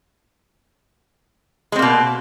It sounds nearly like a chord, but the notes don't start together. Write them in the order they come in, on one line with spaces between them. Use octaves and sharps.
G#3 C4 A#3 B2